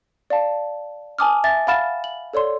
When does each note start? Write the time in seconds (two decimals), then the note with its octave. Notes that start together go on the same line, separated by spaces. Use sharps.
0.30 D5 F5 A5
1.19 G#5 A5 D6 D#6 F6
1.44 E5 G#5 D6 A6
1.67 F5 F#5 B5 F6 A6 E7
2.04 F#7
2.34 A4 C#5 D5 C6